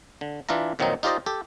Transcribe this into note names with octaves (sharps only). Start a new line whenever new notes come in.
D3
E3 D4 F4 E5 A#5
F2 A#2 D#3 F#3 C4 D#4
D#4 F4 G4 C5 D5 D#5
G4 A4